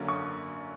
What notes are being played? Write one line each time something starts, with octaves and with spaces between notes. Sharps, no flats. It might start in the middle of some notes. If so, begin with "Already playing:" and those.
Already playing: F#2 D3 F#3 A#3 C#4
C#6